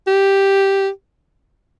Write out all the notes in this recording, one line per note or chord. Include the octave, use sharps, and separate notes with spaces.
G4